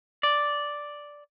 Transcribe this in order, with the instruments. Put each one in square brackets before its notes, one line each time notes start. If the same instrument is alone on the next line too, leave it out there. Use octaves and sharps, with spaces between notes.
[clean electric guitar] D5